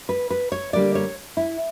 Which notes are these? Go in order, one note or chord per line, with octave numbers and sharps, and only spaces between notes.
B4
B4
C#5
D3 G3 A#3 D4 D5
C#5
E4